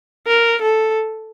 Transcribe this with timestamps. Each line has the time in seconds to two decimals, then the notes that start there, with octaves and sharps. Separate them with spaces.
0.27 A#4
0.62 A4